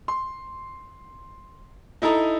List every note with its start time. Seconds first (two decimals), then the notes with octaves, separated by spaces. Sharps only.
0.08 C6
2.02 D#4 E4 A4 A#5 D#6